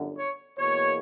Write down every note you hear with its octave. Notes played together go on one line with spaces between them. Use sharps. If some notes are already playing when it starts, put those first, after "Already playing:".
Already playing: G1 F#2 D3
C#5
E2 B2 A#3 C#5